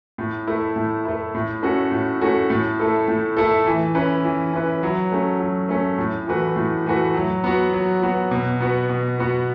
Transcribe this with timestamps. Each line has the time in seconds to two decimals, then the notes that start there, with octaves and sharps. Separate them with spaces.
0.18 A2
0.47 A3 E4
0.76 A2
1.05 A3 E4
1.35 A2
1.62 A3 C#4 F#4 A4
1.91 A2
2.21 A3 C#4 F#4 A4
2.50 A2
2.80 A3 E4 A4
3.08 A2
3.37 A3 E4 A4
3.66 E3
3.95 C#4 E4 B4
4.24 E3
4.53 C#4 E4 B4
4.83 F#3
5.12 A3 C#4
5.40 F#3
5.69 A3 C#4
5.98 A2
6.27 E3 A3 F#4 B4
6.56 A2
6.86 E3 A3 F#4 B4
7.14 F#3
7.44 B3 F#4
7.72 F#3
8.02 B3 F#4
8.31 B2
8.60 B3 F#4 B4
8.90 B2
9.19 B3 F#4 B4